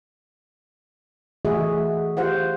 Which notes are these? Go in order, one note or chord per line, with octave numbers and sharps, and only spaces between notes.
E3 A3 F#4 G#4 D#5 E5
F4 G4 C5 F5 F#5